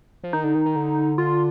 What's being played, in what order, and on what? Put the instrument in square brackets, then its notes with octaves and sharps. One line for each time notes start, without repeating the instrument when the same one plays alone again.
[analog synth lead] F3
[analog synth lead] D#3 [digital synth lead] D#4
[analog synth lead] D3
D#3
D#3
D3
[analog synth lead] D3 [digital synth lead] F4